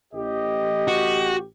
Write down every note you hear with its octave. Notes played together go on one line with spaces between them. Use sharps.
A1 G4 D#5
F#4